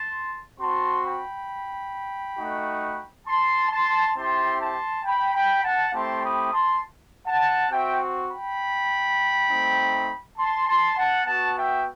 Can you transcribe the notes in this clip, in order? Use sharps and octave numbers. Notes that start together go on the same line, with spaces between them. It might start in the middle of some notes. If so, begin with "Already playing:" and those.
Already playing: A5 C6
C4 F#4 A5 C6
G5 B5
A3 D#4 F#4
A5 C6
A5 C6
C4 E4 G4 A5 C6
A5 C6
G5 B5
G5 B5
F#5 A5
A3 C4 E4 G4 A5 C6
B5 D#6
A5 C6
F#5 A5
C4 F#4 E5 G5
G5 B5
A3 C4 D#4
A5 C6
A5 C6
F#5 A5
B3 F#4 F#5 A5
E5 G5